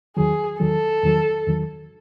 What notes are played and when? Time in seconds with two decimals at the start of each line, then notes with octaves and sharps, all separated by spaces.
0.16 E2 D#3 F#3 G#4
0.60 E2 D#3 F#3 A4
1.03 E2 D#3 F#3
1.47 E2 D#3 F#3